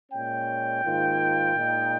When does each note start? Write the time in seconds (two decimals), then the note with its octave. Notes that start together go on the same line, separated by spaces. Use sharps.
0.12 A#2 G#3 C#4 G5
0.84 G#2 D#3 A#3 F4
1.55 A#2 G#3 D#4